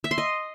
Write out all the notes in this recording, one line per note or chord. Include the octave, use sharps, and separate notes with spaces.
E5
C6
D#5